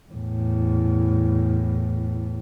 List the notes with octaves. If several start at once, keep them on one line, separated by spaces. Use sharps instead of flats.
E2 A2